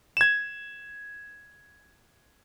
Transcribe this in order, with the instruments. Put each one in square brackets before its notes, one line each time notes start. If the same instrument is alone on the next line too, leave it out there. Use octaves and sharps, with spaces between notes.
[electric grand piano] G#6 E7